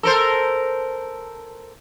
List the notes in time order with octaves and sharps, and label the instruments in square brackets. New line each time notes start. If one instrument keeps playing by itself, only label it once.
[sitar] A4 A#4 C5